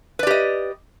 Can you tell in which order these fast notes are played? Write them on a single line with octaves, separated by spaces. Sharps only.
B4 D5 G4 D#5